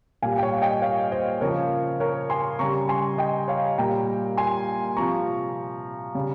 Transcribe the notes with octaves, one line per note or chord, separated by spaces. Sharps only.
A#2 G3 F5 G#5
G5
C#5 F5
D#5 G5
C#5 F5
C5 D#5
C#3 F3 A#4 C#5
A#4 C#5
G#5 C6
C#3 G3 A#5 C#6
G#5 C6
D#5 G5
C#5 F5
A#2 G3 G5 A#5
G#5 C6
C3 F3 A#5 C#6
C#3 G3